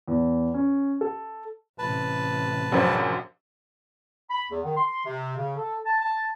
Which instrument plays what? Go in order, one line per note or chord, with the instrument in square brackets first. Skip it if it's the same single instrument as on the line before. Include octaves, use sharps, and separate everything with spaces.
[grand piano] E2
C#4
A4
[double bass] A1 C3 [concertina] B4 A5
[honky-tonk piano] A#1 F#2 C5
[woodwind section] B5
E2
D#3
C6
C3
C#3
A4
A5
A5